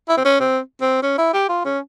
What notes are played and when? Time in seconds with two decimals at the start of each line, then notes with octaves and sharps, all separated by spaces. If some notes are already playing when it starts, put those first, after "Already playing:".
0.09 E4
0.17 C4
0.25 C#4
0.40 C4
0.82 C4
1.03 C#4
1.18 E4
1.34 G4
1.49 F4
1.65 C#4